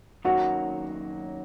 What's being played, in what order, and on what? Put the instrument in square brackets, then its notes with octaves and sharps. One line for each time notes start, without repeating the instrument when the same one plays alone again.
[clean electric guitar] F#2 D#3 F#3 A#3 [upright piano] F#4